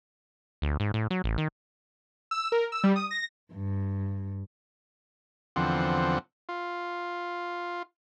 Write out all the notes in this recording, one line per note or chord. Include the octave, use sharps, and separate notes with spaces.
D2
G#2
A2
F#3
A1
D#3
E6
A#4
E6
G3
D#6
A#6
G2
E2 D3 F3 C4 F#5
F4